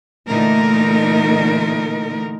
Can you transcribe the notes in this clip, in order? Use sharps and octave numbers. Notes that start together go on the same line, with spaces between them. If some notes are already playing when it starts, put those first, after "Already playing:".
A#2 D3 E3 A3 D#4 A#4